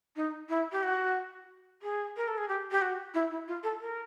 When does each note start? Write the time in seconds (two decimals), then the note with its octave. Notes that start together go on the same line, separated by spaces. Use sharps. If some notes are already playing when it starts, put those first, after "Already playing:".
0.16 D#4
0.49 E4
0.72 G4
0.83 F#4
1.82 G#4
2.17 A#4
2.28 A4
2.38 G#4
2.49 G4
2.71 G4
2.82 F#4
3.14 E4
3.31 E4
3.48 F4
3.63 A4
3.81 A#4